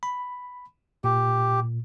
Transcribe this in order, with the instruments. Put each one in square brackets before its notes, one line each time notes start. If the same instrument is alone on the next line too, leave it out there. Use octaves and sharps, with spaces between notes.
[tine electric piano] B5
[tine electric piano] A#2 [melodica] G4